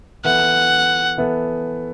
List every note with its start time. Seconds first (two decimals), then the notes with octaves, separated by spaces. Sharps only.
0.24 E3 B3 A4 F#5
1.18 E3 B3 A4